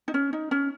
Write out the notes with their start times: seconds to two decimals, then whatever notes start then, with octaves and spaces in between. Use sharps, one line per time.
0.08 D#4
0.14 C#4
0.33 D#4
0.51 C#4